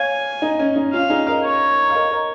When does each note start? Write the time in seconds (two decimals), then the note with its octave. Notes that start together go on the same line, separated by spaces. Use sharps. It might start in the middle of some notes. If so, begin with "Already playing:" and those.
Already playing: C#5 F5 G#5
0.42 D#4
0.59 C#4
0.76 D#4
0.93 C#4 F4 F5
1.10 D#4 G#4
1.27 A#4 D#5
1.44 C#5
1.90 F5
1.95 A#4 D#5
2.11 A#4 D#5